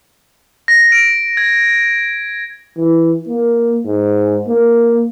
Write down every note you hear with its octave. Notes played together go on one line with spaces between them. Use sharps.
A#6
D7
G#6
E3
A#3
G#2
A#3